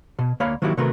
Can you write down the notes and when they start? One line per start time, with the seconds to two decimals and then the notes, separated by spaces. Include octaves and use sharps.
0.19 B2
0.40 D2 A#3 C#5 F5 B5
0.62 D#3 F#3 A#3 E4 F#4 G4
0.77 C3 D#3 A3 F#4 A#4 B4